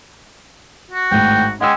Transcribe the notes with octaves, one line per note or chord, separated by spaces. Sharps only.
F#4
G#1 A2 G5
G#3 C#4 F#5 G5 E6